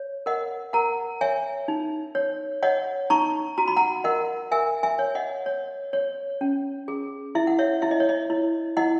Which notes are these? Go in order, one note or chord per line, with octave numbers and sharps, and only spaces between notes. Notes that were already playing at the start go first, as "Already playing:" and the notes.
Already playing: C#5
A#4 D#5 F#5
A#4 F#5 A#5
C#5 E5 G#5
D#4
C#5
C#5 D#5 F#5
D#4 A#5 C#6
F#4 A#5
B5
F#5 A#5
A#4 D#5 F#5
A#4 E5 G#5
E5 G#5
C#5
D#5 F#5
C#5
C#5
C#4
G#4
E4 E5
F#5
C#5 E5
E4 E5
D#5
C#5
D#5
E4
E4 D#5 F#5